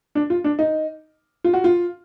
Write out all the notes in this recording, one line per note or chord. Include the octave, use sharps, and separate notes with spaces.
D4
F4
D4
D#4
F4
F#4
F4